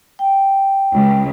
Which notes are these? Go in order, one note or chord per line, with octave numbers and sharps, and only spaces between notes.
G5
C#2